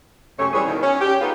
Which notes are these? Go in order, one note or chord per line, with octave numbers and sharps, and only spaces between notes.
F#2 C3 A3 C#4 C#5
E3 G3 C4 G#4 A4 C#5
B2 D#3
C#4
G4
B3 D#4 F4 F#4 G#4 B4